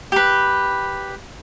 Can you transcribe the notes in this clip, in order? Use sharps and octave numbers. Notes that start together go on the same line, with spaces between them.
G4 B4